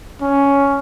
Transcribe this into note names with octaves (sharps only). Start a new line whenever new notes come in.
C#4